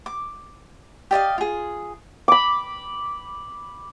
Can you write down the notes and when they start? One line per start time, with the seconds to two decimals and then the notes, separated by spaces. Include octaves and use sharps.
0.06 D6
1.11 G4 D5 D#5 F5
1.38 F4 G#4
2.28 B5 D6